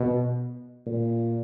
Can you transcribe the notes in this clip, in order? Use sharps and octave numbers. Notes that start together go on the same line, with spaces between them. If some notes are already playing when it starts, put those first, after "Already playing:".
Already playing: B2
A#2